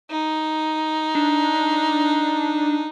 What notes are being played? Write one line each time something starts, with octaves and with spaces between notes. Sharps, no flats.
D#4
D4